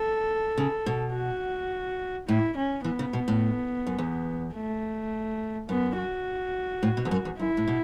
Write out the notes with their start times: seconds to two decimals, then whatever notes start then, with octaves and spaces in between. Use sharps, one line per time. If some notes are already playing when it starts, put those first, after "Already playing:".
Already playing: A4
0.58 C#3
0.86 B2
1.14 F#4
2.28 A2 E4
2.56 C#4
2.84 E3 B3
2.99 C#3
3.13 B2
3.28 A2
3.87 F#2
3.98 E2
4.55 A3
5.69 F#2 B3
5.98 F#4
6.83 A2
6.97 B2
7.05 E2
7.11 F#2
7.25 E2
7.39 F#2 E4
7.57 A2
7.68 B2